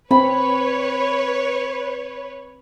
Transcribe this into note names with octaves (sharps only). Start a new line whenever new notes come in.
C4 B4 C#5 B5